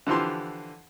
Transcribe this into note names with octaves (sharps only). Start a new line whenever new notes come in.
D3 E3 F3 G4 C6